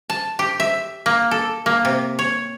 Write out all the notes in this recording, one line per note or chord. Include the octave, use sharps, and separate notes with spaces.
A5
G4
E5
A#3
A4
A#3
C3
C#5